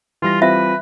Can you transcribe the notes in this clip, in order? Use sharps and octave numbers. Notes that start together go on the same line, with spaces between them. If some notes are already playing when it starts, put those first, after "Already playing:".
E3 G3 F4 A#6
C4 F4 B4 E5